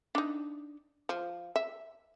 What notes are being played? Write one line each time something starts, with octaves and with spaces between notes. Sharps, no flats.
D4 D#4
F3
E5